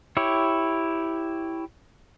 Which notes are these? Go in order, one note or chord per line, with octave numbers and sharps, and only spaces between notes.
E4 G4 C#5